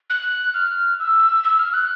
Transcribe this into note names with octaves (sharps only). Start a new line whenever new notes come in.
F#6
F6
E6
E6
F6
F#6